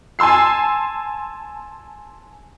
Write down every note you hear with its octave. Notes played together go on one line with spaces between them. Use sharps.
G#5 A5 C6 E6 C7